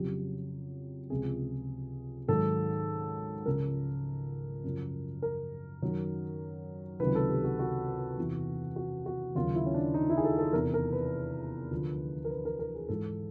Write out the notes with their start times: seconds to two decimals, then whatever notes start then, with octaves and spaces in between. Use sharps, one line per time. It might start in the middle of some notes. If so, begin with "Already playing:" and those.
Already playing: F2 C#3 F#3 G4
1.10 C#2 C3 F3 G#4
2.28 G#2 D#3 F#3 A4
3.46 C#2 C#3 F3 A#4
4.64 F#2 C#3 F3
5.22 A#4
5.82 F#2 D#3 F#3
7.00 C#2 C3 D#3 F#3 B4
7.15 A4
7.30 G4
7.44 F#4
7.59 F#4
8.18 E2 C3 E3
8.76 F#4
9.06 F#4
9.35 D#2 C#3 F#3 F4
9.55 E4
9.66 C#4
9.74 D4
9.94 D#4
10.10 E4
10.17 G#4
10.24 A4
10.39 A4
10.53 E2 C3 E3 A#4
10.74 A#4
10.93 B4
11.71 D2 D3 F3
12.25 A#4
12.30 B4
12.45 A#4
12.59 A#4
12.75 G#4
12.89 G#2 E3 A4